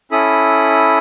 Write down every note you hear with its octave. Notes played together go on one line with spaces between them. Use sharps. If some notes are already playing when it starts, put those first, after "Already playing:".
C#4 E4 A4 B5 D#6